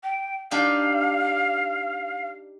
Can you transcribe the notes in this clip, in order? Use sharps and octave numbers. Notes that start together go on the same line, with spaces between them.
G5
D4 D#4 G4 F5